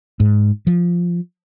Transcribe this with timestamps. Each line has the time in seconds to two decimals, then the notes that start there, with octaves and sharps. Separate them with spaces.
0.20 G#2
0.67 F3